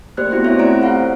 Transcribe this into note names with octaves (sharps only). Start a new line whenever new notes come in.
A3 A#3 G4 C5 D5 F#6
B3 C4 E4 F#4 G4
E4 A4 C5 C#5 E5
A3 C4 D5 A#5 D7
F4 A4 D5 F5 F#5